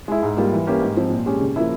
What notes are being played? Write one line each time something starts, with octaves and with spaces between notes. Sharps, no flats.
G#3 E4
G#2
G3 A#3 F4
E3
A#3 C#4 G4
G#2
F3 C4
A#2
G#3 C#4 G4
C#3
F3 A#3 E4